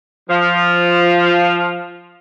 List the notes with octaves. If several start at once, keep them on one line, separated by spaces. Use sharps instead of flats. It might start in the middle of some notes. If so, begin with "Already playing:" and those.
F3